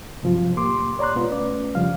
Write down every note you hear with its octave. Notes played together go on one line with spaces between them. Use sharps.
G2 C3 F3 F#3 F4
C2 A2 A#3 G4 C6 D6
C#5 D5 A#5 C6 F#6
B2 G#3 B3 F4
A3 C#4 B4 D5
F2 C#3 F3 G3 F5